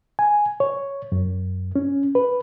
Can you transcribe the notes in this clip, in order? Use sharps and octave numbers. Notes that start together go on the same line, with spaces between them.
G#5
C#5
F#2
C#4
B4